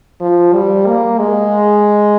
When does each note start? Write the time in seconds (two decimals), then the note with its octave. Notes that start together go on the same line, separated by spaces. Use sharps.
0.21 F3
0.53 G3
0.86 A#3
1.19 G#3